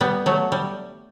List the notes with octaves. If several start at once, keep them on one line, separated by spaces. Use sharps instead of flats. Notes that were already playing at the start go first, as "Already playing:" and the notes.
G3 B3
F#3 A3
G3